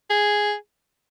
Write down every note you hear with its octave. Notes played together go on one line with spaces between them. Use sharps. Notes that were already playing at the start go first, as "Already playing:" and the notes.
G#4